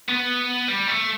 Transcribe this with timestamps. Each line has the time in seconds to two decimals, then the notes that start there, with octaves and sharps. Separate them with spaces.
0.09 B3
0.68 G3
0.88 A3